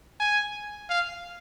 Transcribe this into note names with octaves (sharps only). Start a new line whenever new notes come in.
G#5
F5